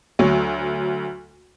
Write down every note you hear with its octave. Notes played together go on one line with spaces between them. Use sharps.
D2 F#3